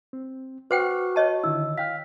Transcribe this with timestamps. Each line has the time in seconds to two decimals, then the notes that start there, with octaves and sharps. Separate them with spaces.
0.13 C4
0.71 F#4 B4 C5 F#5 G5 D6 F6 F#6
1.16 C#5 D#5 A5
1.44 D3 D#3 E4 E6
1.78 F5 G5 F6 B6